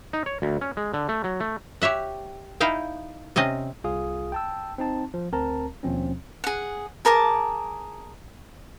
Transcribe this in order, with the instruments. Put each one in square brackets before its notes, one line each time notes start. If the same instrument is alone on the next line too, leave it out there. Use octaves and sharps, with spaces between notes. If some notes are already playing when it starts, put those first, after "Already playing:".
[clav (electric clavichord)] D#4
C#5
D2
C#4
G#3
D3
A3
F#3
A3
[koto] G4 C#5 E5 F#5
D#4 E4 F5 G5
C3 C4 C#4 D#5
[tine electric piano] C2 F4 G#4 F5 D#6
G5 A5 E6
C4 D#4 A5
F3
D2 C4 A#4 A5 A#5
D#2 B2 F3 C4 C#4
[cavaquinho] G#4 F#5
G#4 A#4 A5 D6